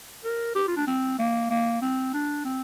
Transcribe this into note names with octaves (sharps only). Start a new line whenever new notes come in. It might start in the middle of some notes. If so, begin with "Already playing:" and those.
A#4
G4
F4
D4
C4
A#3
A#3
C4
D4
C4